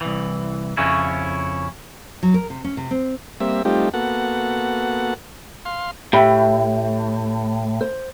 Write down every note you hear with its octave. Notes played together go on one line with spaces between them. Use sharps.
C2 E3
F2 C#3 C#4 E4
F#3
A#4
C3
C#4
C3
C4
G3 A#3 C4 E5
G3 A3 C4 D#4 F4 G4
A#3 B3 F#4 A4 F#5
F5 C6
A2 G4 E5 B5
C5